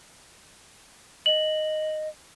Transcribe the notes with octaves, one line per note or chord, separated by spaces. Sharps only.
D#5 F#7